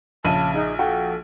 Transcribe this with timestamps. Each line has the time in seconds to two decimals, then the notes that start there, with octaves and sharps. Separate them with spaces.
0.25 A#1 C#3 A5 D#7
0.54 D#4 G#4
0.79 F#4 A4 F5 G5